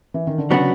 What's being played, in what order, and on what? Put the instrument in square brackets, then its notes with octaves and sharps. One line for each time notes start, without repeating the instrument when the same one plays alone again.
[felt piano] E3
D#3
D3
[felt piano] C#3 [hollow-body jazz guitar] F#3 B3 D4 F#4